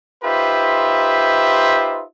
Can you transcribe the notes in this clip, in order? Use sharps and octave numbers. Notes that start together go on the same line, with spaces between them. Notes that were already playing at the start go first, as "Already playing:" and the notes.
D#4 F4 G4 B4 C5 E5